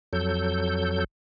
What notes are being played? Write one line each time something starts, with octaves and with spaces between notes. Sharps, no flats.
F2 F#3 A4 G6